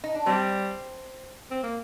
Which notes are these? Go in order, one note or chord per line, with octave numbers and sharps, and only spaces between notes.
D#4
D4
G3 C4
C4
A#3